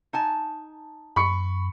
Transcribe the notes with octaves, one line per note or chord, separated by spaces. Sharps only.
D#4 G#5 A5
F#2 B5 C#6 C#7